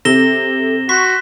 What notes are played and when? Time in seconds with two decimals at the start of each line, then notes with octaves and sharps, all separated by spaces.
0.05 C3 A4 A#6 E7 G7
0.89 F#4 C6 C#6 B6